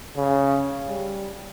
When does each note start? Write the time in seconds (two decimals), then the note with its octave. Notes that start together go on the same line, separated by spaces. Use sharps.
0.17 C#3
0.88 G3